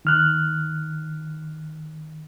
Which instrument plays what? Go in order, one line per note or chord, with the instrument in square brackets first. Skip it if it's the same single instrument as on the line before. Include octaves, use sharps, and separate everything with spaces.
[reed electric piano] D#3 F6 F#6